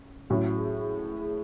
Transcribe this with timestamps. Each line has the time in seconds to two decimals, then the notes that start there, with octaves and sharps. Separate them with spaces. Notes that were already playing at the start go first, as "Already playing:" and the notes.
Already playing: C#4
0.29 A1 A2 F#3 C#4 E4
0.50 E4 G#4
0.73 G#4 B4
0.94 A4 C#5
1.15 G#4 B4